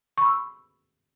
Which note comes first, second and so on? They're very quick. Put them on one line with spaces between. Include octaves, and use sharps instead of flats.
C#6 B5 E6